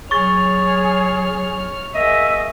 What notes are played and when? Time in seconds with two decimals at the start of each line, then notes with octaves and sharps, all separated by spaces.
0.11 F#3 G#4 C#5 C#6 F6 A6
1.94 A#3 G#4 D#5 E5